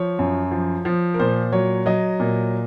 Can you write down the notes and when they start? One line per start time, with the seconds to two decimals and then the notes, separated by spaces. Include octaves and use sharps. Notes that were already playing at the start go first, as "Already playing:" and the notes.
Already playing: F3 C#5
0.19 F#2
0.51 F3
0.85 F3
1.14 A#4
1.19 A#2 C5
1.52 F#3 C#5
1.86 F#3 D#5
2.20 A#2